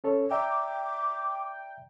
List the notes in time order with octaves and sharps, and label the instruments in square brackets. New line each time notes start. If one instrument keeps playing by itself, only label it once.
[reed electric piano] C#4 A4 C#5
[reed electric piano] D5 E5 A#5 [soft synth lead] G5 [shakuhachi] D6